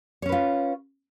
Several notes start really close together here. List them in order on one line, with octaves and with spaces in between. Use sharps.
C#5 C#4 B4 F4